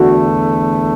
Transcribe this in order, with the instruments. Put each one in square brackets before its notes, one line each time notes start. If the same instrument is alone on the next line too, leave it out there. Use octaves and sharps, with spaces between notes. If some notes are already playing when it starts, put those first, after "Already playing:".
Already playing: [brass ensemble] E2 D3 A3 D4 F#4